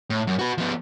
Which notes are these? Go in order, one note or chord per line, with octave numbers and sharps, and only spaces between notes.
A2
F#2
F#4 B4
F3 B3